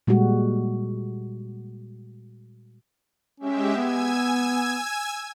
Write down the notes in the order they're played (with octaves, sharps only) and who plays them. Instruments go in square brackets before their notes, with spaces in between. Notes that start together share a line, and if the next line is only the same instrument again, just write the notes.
[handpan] A#2 G3 G#3 F#4
[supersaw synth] G#3 G4 E5 [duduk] C#4
[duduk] B3 [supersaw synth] G#5 E6 G#6